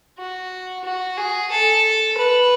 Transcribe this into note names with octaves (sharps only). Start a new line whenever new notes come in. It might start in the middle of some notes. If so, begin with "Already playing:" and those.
F#4
F#4
G#4
A4
B4